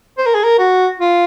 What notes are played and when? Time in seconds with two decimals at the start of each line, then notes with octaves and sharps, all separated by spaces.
0.18 C5
0.26 A#4
0.35 G#4
0.44 A#4
0.59 F#4
1.00 F4